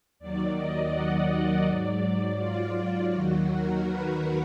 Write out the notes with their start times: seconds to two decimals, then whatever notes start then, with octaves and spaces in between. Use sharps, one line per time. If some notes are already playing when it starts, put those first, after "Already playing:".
0.19 D#2 D#3 F#3 D5
0.56 D#5
0.92 F#5
1.29 D#5
1.65 G#2 F#3 D5
2.39 F4
3.11 D#2 D#3 F#3 F#4
3.48 A#4
3.84 B4